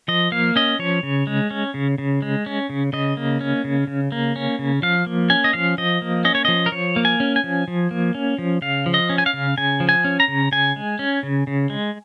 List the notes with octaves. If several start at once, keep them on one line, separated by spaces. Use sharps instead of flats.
F3 D#5
A#3 F5
C#4 D#5
F3 C#5
C#3
G#3
C#4
C#3
C#3
G#3
C#4
C#3
C#3 D#5
A#3
C#4
C#3
C#3
A#3
C#4
C#3
F3 F5
A#3
C#4 G#5
D#5
F3 F5
F3 D#5
A#3
C#4 D#5
C#5
F3 D#5
A#4
F3 C#5
A#3
G#5
C#4
G#5
F3
F3
A#3
C#4
F3
C#3 F5
F3
D#5
C#4
G#5
F5
C#3
C#3 G#5
F3
G#5
C#4
A#5
C#3
C#3 G#5
G#3
C#4
C#3
C#3
G#3